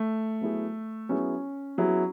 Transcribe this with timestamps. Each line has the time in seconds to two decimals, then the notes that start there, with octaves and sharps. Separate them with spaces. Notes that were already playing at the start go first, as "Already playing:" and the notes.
Already playing: A3
0.41 F#3 B3 E4 G#4
1.09 F#3 B3 C#4 E4 G#4
1.78 F#3 B3 E4 G#4